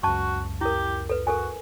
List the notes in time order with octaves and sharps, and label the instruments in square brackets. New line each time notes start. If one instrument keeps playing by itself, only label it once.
[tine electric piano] C#2 F#2 [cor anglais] F#4 [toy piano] A5 C#6
[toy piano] E4 A#4 [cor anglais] G4
[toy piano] A4 B4
[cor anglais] F#4 [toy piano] A4 A#4 G#5